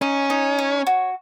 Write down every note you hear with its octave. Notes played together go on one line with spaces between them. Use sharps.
C#4 D#4
D#4
C#5
F#4